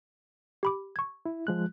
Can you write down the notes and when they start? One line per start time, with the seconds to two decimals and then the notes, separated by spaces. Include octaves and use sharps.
0.63 G4 B5 D6
0.96 C#6 G#6
1.26 E4
1.47 F3 G#3 F#6